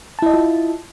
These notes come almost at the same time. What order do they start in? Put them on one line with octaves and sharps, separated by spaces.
A5 E4 D#5 E5 F4